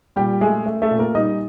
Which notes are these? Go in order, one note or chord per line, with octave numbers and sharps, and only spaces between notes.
A#2 G3 G4
G#3 A3 G#4
A3
A3 A4
A#2
A#3 A#4
G3 D#4 D#5